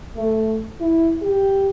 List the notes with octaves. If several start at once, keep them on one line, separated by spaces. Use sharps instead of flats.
A3
E4
G4